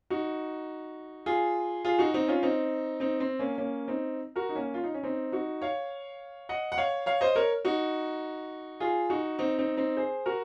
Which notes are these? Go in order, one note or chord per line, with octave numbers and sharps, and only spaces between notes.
D#4 F#4
F4 G#4
F4 G#4
D#4 F#4
C4 D#4
C#4 F4
C4 D#4
C4 D#4
C4
A#3 C#4
A#3 C#4
C4 D#4
F#4 A#4
D#4
A#3 C#4
F4
D#4
C#4
C4 D#4
D#4 F#4
C#5 F5
D#5 F#5
F#5
C#5 F5
C#5 F5
C5 D#5
A#4 C#5
D#4 F#4
F4 G#4
D#4 F#4
C4 D#4
C4 D#4
C4 D#4
G#4 C5
F#4 A#4